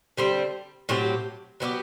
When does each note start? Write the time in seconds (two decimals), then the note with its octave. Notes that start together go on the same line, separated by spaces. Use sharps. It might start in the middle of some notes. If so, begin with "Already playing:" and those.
0.17 D3 G3 C4
0.89 A2 F#3 C4 G4
1.60 F#3 B3 E4 G4